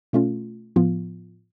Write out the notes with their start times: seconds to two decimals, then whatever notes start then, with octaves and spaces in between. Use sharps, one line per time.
0.13 B2 A3 C#4 F4
0.76 A2 F3 B3 F4